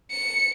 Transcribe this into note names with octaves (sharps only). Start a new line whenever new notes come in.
C#7